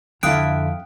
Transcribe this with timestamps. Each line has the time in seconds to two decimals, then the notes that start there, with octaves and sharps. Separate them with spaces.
0.23 F2 D3 E4 F5 G5 D#6 F#6 D7